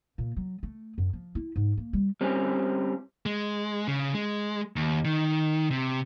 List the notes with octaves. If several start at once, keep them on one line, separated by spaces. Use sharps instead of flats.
A#2
F#3
A3
F#2
F3
E4
G#2
A#3
G3
G3 C4 C#4
G#3
C#3
G#3
D#2
D#3
C3